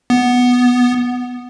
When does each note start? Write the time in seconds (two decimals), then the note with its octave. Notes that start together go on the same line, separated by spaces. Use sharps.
0.10 B3